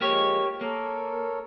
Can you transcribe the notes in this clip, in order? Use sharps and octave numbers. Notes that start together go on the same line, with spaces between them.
F3 G#3 A#3 G4 C#5
A#3 A4 A#4 C#5